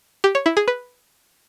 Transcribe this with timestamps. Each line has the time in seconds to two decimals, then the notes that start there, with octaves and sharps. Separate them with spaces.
0.24 G4
0.35 C#5
0.46 E4
0.57 G#4
0.68 B4